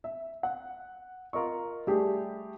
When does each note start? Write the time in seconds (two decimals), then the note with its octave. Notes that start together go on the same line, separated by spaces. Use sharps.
0.04 E5
0.43 F#5
1.33 F4 A#4 D#5 C#6
1.87 G3 A3 D4 G4 G#4